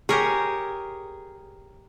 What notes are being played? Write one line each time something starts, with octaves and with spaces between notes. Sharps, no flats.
G4 G#4 A#4 C#5